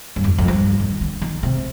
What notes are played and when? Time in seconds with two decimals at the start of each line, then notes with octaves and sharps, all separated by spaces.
0.16 G2
0.24 F2
0.38 F2
0.48 G2
0.80 D#3
1.01 D3
1.22 D#3
1.43 C3